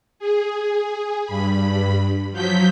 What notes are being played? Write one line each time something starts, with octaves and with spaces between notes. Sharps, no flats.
G#4
G2 B5
F3 F#3 G6 B6